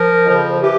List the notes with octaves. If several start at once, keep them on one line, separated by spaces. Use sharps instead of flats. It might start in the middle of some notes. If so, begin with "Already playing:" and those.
Already playing: F3 A#4
F2 C#3 F3
E3 G4